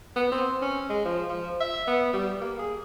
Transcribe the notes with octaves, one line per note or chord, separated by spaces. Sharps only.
B3
C4
C#4
G#3
F3
F3
E5
B3
G3
A#3
G#4